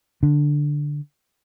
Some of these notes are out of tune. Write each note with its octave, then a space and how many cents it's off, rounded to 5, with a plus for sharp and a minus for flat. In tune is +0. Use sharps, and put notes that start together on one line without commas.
D3 +0 D4 +0